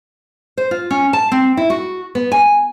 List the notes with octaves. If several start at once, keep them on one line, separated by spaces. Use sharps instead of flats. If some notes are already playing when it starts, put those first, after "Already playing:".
C5
F4
C#4
A5
C4
E4
F#4
B3
G#5